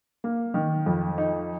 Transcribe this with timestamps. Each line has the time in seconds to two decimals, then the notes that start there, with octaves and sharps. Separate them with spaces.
0.24 A#3
0.54 D#3
0.86 F2
1.18 D#4